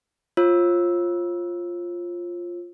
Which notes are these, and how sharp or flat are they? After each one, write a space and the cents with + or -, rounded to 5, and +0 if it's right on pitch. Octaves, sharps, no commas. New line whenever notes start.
F4 +0 C#5 -45 E6 -5